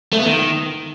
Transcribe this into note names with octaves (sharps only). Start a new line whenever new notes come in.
A3
B3
D#3